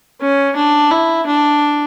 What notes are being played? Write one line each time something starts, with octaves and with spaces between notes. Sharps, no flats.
C#4
D4
E4
D4